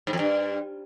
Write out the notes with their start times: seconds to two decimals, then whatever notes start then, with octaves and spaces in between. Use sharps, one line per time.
0.07 G#2
0.13 F2
0.19 G2